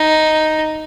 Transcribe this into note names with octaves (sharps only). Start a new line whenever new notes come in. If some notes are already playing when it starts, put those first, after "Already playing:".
Already playing: D#4